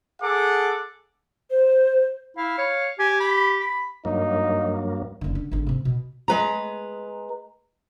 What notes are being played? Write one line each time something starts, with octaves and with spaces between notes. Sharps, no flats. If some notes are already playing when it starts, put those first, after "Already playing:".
G#4 A4 F#5 D6
C5
E4 F5
C#5
G4 G#5
B5
B5
G2 F#3 A#3 D#4
F#1 D3
D3
G#1 D3
C3 C4
B2
G#3 B4 A#5